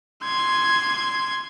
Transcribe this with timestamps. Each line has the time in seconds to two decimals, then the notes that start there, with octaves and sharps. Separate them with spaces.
0.24 C6 G#6